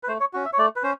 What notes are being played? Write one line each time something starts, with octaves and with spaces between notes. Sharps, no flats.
B4
A3 C5
C#5
C#4 F#4
E5
C#5
A3 D5
B4
C#4 C5